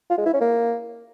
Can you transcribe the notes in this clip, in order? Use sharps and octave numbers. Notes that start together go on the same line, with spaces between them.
F4
G#3
E4
C#4
A#3